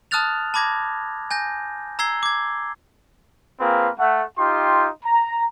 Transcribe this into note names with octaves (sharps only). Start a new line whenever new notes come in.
A5 D#6 F6 F#6 A6 F7
A5 B5 D6 G#6 A#6
G#5 G6 A#6
A#5 E6 G#6 C7 G7
D6 G#6
A#3 C4 F4 G#4 B4 F5
A3 F#5
D#4 F4 G4 G5 C6
A#5